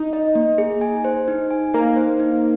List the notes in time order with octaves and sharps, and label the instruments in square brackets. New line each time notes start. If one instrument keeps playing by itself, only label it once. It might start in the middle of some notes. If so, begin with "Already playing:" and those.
Already playing: [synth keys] D#4
[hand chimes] D#5
A#3
G#4
G#5
C5
D#4
G#5
[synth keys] A#3 [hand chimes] D#4
[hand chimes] C5
D#4